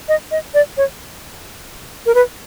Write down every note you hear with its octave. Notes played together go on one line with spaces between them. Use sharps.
D#5
D#5
D5
C#5
A#4
B4